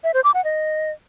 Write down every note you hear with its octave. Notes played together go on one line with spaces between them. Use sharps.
E5
C5
D6
F#5
D#5